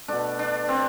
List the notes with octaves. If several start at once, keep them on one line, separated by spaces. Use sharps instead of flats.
B2 A3 D4
D4
C4